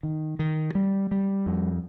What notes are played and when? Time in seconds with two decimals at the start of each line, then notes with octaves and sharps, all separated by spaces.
0.03 D#3
0.39 D#3
0.75 G3
1.11 G3
1.46 F2